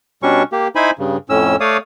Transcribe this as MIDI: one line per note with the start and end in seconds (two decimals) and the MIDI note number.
0.23 0.43 47
0.23 0.43 55
0.23 0.43 61
0.23 0.43 62
0.23 0.43 85
0.52 0.68 58
0.52 0.68 67
0.75 0.91 63
0.75 0.91 64
0.75 0.91 72
0.75 0.91 80
0.75 0.91 83
0.99 1.17 43
0.99 1.17 49
1.29 1.56 41
1.29 1.56 45
1.29 1.56 61
1.29 1.56 88
1.60 1.77 57
1.60 1.77 73
1.60 1.77 74
1.60 1.77 77
1.60 1.77 87